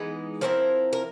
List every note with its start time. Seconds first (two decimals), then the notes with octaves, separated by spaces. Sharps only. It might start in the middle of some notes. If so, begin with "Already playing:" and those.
Already playing: E3 G#3 B3 D#4
0.41 F3 A3 C4 E4 A#4
0.93 A#4